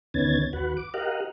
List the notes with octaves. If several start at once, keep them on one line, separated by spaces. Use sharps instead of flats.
D2 D#3 B3 C#4 G#6 A6
D#2 F#4 B4 F#5
D6
G4 A#4 D#5 F5 F#5